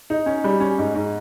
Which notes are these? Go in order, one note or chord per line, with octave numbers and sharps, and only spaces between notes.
D#4
C#4
G3
C#4
G#2
G#2